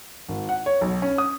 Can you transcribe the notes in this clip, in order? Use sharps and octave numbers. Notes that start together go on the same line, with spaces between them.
G#1
F#5
C#5
B1
C#4
D#6